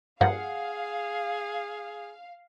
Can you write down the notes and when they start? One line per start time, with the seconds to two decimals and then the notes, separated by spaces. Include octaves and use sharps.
0.21 G2 F3 A#3 G#4 F5 F#5